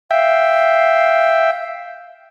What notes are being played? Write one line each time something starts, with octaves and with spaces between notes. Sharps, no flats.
E5 F5 G5